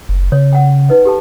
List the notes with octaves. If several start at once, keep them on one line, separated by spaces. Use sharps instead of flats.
F#1
C#3 C#5
F#5 G5
D#4 B4 D#5
G4 A4 A5